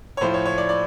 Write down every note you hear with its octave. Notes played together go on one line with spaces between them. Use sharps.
C#5
A2 F3 C5
C#5
C#5
D5
D5